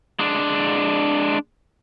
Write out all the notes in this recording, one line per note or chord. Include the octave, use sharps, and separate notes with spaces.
G#3 D4